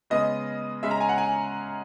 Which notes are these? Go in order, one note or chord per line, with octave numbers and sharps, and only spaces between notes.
C#3 G#3 B3 D#5
C#3 G#3 C#4 E5
A#5
G#5
F#5
G#5